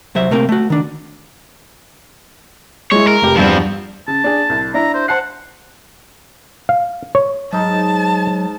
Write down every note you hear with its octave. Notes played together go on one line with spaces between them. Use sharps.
C2 F#3 C5 E5
C3 A3 A#3 C4 A#4
A3 F#4
D#3 D4
G#3 E4 C#5
A#4
F1 G4
E2 G2 F3 C4 F7
C#3 A5
D4 G#4
C2
D4 E4 A#5
C5
C5 F#5 A5 C7
F5
C#5
G#2 F#3 D#4 A5